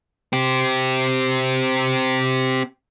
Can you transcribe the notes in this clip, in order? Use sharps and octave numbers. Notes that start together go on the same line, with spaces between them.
C4 G4